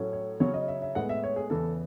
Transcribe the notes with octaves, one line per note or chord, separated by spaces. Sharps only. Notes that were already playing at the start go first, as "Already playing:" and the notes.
Already playing: A2 F#3 A3 C#4
C#5
C#3 F#3 C#4 C#5
D#5
E5
E5
A2 G#3 B3 F#5
E5
C#5
G#4
E2 C#3 E3 A4